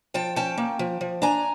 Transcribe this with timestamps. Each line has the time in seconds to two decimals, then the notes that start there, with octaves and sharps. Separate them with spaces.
0.14 F3 G5 A5
0.36 C#4 G5 A5
0.58 A#3
0.79 F3
1.01 F3
1.22 D4 G#5 A#5